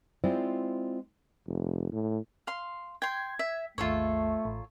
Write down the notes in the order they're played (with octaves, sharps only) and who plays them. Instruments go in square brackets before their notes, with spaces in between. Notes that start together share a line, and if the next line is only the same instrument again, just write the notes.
[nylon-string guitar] G#3 C4 E4 F4 C5 D5
[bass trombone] F1
A2
[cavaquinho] F5 C6
[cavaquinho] G5 C6 [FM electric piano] G#6
[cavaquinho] E5
[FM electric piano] G#1 D#2 [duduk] A3 [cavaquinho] F4 A4 C#5
[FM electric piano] A1